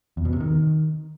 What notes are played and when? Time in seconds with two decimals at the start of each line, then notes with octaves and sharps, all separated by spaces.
0.17 E2
0.25 B2
0.33 C3
0.41 D#3